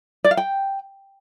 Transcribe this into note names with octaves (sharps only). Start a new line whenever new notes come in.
D5
F5
G5